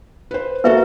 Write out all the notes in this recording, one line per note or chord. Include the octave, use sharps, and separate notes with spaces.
B4 C5
A#3 F#4 A4 B4 E5